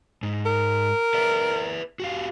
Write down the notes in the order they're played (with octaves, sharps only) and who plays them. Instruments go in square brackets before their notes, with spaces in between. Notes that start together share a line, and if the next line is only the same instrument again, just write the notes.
[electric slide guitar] G#2
[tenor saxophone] A#4
[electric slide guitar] B4 D5 E5
F#4 G4 F5